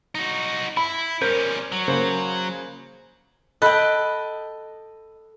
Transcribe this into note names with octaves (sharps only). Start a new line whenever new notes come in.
D#4 F#4
E4 B5
G3 C#4 A#4 C5 G6
F#3
C#3 A#3 C5
A4 D#5 G5 B5 F#6